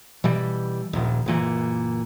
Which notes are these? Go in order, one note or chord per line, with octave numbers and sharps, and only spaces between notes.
B2 E3 G3
D#1 A#1
F#1 A#2 E3